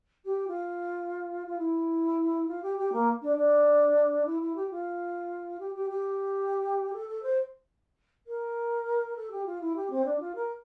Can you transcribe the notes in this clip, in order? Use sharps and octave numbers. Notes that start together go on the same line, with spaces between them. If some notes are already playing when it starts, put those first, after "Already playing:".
G4
F4
F4
E4
F4
G4
G4
A#3
D4
D4
E4
E4
G4
F4
G4
G4
G4
A4
A4
C5
A#4
A4
G4
F4
E4
G4
C4
D4
F4
A#4